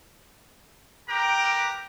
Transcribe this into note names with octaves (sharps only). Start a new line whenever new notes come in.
G4 A#4 B4 G5 A#5 D6